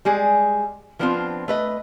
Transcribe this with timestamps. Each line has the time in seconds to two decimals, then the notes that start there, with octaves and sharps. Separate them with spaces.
0.05 G3 G#3 G#4 D5
0.99 F3 B3 C4 D4 E4 F4
1.48 A3 B4 D#5